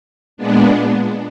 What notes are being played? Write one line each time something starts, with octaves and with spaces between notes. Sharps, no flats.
A#2 G#3 B3 D4